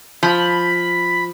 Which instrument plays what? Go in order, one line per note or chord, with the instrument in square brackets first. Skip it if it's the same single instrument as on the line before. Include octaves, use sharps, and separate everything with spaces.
[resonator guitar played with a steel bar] F3 [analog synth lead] B5